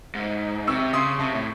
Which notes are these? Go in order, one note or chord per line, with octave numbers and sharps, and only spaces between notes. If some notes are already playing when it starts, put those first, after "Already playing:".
G#2
C3 C#6 E6
C#3 C6 D#6
C3 A5 C#6
A2